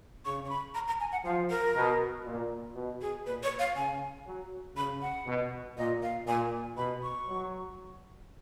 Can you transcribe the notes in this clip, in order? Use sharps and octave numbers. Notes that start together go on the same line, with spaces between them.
C#3 C#6
C#6
B5
A#5
A#5
G#5
F#5
F3 F5
A#4
B2
A#2
B2
G#4
A#2 B4
C#5
F5
C#3 G#5
F#3
C#3 B5
F#5
B2
A#2 D#5
F5
A#2 G#5
B2 B5
C#6
F#3